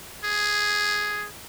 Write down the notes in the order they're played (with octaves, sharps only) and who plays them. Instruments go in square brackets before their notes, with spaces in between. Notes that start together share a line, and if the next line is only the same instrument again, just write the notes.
[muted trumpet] G#4